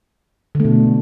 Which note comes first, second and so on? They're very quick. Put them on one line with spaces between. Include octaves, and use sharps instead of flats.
D3 A3 B2